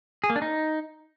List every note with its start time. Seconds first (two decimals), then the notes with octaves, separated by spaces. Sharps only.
0.24 G#4
0.30 A#3
0.36 D4
0.42 D#4